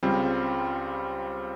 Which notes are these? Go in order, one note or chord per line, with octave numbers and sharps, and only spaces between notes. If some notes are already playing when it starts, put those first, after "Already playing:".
C#2 C#3 G3 C4 F4